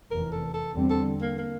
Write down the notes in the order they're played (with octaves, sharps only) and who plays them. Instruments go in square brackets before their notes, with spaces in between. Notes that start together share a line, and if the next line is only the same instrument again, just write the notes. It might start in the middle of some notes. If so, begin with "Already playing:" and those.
[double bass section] F1 E2 E3 [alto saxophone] A#4
[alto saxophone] A4
A4
[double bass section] E2 D3 G3 C4
[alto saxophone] A4
A#3
A#3